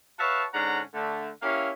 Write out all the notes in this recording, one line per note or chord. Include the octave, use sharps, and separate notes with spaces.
F#4 B4 C#5 E5 F5 A5
G#2 D3 C#4 D4 F#5 A#5
D3 A3
A#3 C#4 E4 G4 E5 F5